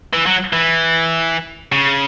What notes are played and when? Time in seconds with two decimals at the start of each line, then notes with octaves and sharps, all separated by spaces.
0.13 E3
0.26 F#3
0.53 E3
1.72 C#3